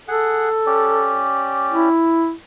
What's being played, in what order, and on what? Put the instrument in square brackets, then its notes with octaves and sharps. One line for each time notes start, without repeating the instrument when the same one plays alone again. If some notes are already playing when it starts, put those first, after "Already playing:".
[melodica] G#4 F#5 [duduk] A4
[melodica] C#4 G4 D5
[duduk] E4